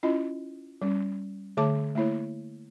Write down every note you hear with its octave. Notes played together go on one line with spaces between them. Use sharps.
C#4 E4 F4 D#5
G3 C#4
D3 A3 C#5 A5 D6
A3 A#3 E4 C#5